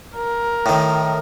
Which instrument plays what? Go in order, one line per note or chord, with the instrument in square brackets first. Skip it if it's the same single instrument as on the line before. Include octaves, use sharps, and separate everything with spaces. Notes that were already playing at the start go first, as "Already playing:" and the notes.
[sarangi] A#4
[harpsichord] A2 D#3